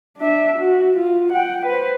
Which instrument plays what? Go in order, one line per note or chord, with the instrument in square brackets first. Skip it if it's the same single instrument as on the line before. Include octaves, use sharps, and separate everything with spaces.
[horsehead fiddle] D4 E5
F#4
F4
F#5 G5
B4 C5